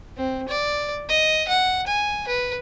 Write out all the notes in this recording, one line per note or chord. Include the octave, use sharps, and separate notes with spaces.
C4
D5
D#5
F#5
G#5
B4